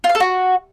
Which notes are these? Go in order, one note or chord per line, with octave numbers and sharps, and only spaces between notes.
F4
F5
A4
F#4